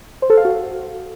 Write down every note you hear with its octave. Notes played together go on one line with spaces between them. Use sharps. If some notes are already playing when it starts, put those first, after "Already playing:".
C5
A4
F5
F#4